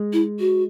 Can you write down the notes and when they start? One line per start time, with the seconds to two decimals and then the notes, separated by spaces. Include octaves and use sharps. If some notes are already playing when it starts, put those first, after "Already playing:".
Already playing: G#3
0.13 E4
0.40 F#4